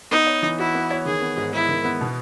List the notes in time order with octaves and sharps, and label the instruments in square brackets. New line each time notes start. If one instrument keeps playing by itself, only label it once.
[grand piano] B3 [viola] D#4
[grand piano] C#5
E3
[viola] E4 [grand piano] F#4
[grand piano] B3
C#5
[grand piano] D#3 [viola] G#4
[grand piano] B3
G#2
[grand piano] G#3 [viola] E4
[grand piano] D#3
B3
B2